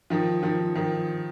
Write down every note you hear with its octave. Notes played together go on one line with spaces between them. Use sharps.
D#3 F3
D#3 F3
D#3 F3